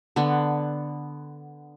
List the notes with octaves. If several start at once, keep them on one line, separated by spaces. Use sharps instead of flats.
D3 B3